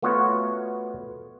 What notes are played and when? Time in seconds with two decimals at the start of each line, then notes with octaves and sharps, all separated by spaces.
0.02 A3 B3 F4 F#4 C#5 F#5